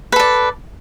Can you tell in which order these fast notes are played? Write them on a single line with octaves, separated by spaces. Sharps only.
B4 A4 D5